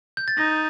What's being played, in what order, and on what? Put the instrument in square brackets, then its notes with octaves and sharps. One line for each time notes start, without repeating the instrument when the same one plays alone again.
[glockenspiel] G6
A6
[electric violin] D#4 [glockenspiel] A#6